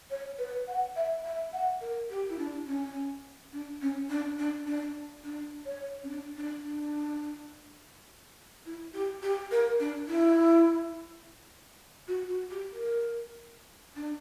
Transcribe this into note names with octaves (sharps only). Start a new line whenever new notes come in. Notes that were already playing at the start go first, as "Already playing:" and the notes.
C#5
B4
F#5
E5
E5
F#5
A#4
G4
E4
D4
C#4
D4
C#4
D4
D4
D4
D4
C#5
C#4
D4
D4
D4
E4
G4
G4
A#4
D4
E4
F#4
F#4
G4
A#4
D4